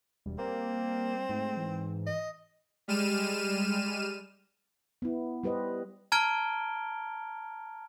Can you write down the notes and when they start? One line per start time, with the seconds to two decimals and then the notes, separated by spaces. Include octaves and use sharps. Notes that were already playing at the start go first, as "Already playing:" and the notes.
0.26 E1 G3
0.38 A#3 C4
1.29 G#2 A3
1.57 E3
2.07 D#5
2.88 G3 G#3 F6 D#7 E7
5.02 B3 E4
5.43 G3 G4 B4 C5 D#5
6.12 A5 A#5 F6 G#6 D7 G7